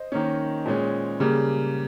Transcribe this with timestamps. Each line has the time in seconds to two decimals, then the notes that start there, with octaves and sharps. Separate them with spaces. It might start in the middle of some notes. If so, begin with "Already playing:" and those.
Already playing: C5 D#5
0.12 D#3 A#3 C#4
0.66 A#2 G#3 C#4
1.20 C#3 G3 A#3